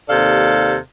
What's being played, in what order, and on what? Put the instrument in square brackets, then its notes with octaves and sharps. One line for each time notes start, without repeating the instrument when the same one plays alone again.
[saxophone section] D#2 C3 A4 D5 F5